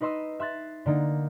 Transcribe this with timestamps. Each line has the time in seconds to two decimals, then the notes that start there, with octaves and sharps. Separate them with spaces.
0.01 D#4 B4 D#5 C6 E6
0.40 E5 C6 F#6 A6
0.86 D3 A#3 D#4